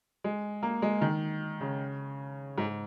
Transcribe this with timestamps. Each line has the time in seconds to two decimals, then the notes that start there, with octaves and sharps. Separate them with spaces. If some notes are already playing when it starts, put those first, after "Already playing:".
0.24 G#3
0.63 A#3
0.82 G#3
1.01 D#3
1.60 C#3
2.58 G#2